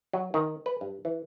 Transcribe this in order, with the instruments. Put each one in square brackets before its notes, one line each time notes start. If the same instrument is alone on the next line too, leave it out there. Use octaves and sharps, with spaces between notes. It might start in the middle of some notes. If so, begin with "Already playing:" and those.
[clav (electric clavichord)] F#3
D#3
B4
G2
E3